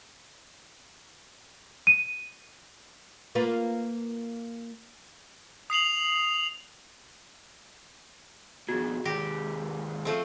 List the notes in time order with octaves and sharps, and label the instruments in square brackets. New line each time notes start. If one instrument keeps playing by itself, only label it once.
[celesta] D#7
[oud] A#3 F4 B4
[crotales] D#6 C7 F7 F#7
[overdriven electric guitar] F2 B2 [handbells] F#4 G#4
[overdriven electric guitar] D#2 G#3 [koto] G4 [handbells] A#6
[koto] F3 A3 C4